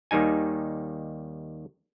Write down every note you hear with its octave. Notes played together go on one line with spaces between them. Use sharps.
D#2 D#3 G3 D#4 G#5